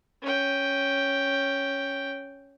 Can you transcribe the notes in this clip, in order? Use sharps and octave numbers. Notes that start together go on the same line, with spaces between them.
C#4 G5